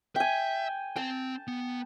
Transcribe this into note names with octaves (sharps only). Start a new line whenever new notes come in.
E5 G5 G#5
C4 G5 A5
B3